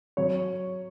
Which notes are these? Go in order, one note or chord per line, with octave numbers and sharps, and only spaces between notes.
F#3 C#5